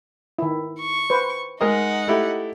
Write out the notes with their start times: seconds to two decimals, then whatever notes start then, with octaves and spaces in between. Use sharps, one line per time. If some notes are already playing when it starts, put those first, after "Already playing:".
0.39 D#3 E4
0.80 C#6
1.10 B4 C5
1.61 G#3 D#4 A#4 D#5 F#5
2.07 A3 E4 G4